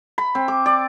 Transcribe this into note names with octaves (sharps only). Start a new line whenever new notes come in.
B5
C4
D6
D5